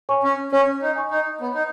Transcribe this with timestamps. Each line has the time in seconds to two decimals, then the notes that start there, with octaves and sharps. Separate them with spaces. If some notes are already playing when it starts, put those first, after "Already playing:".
0.09 C#5 G#5 C#6
0.23 C#4
0.52 C#4 C#5
0.82 D#4
0.96 G#5 C#6
1.11 D#4
1.41 B3 C#5
1.55 D#4